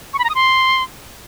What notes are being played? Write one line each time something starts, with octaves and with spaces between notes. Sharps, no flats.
C#6
B5
A#5
D#6
C6